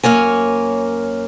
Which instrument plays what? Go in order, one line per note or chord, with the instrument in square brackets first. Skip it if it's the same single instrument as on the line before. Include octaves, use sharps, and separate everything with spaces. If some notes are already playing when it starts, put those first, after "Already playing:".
[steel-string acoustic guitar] F#2 A#3 C#5 G#5